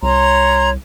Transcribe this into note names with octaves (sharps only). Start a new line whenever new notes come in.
C2 C#5 A#5 C6